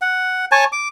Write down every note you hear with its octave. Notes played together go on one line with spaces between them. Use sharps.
F#5
C#5 G#5 A5
D6